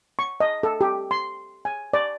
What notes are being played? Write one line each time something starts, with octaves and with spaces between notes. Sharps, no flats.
C#6
D#5
A4
G4
C6
G#5
D5